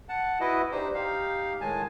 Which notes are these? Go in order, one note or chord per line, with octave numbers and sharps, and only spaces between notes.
F#5 A5
E4 F#4 B4 D#5
D4 D#4 G4 C5
D#4 G4 F5
A2 D#3 G#3 G#5 A5